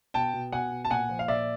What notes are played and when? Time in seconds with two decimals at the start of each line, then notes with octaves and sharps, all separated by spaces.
0.14 B2 G5 A5
0.33 B2
0.52 B2 F#5 G#5
0.71 B2
0.85 A5
0.90 A#2 F#5 G#5
1.09 F3
1.19 F5
1.28 A#2 D5 E5